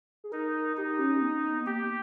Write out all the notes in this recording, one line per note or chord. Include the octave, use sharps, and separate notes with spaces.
G#4
D#4 A#4
D#4 G4
C#4
B3
B3
A#3 G4